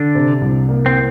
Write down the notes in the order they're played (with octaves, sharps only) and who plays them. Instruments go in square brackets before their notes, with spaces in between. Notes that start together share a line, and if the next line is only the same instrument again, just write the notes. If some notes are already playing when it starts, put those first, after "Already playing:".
Already playing: [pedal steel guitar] D3 D4
[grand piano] C3
C2
A#3
[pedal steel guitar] C4